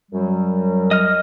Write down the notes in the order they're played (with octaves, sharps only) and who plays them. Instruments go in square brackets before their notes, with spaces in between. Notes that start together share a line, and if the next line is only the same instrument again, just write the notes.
[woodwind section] F#2 F#3 G3
[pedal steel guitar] D#5 F6